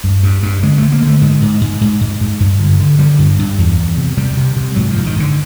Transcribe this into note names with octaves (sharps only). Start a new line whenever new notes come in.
G2
G2
G2
D3 G#3
D3 A3
A#3
D3 A3
G#2 G#3
G#2
G#2
G#2
G#2
G#2
G2
D3
D3
D3 G3
G2
G2
E2
E2
C3
C3 G3
C3
C3
G#2 F#3
F3
G#2
D#3
G#2 D3